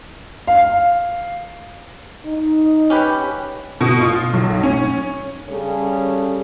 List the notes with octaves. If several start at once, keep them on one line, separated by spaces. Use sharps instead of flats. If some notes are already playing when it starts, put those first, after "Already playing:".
F5
D#4
C#4 G4 B4
B2
F4
B1
C#4
C#3 G3 C#4 A4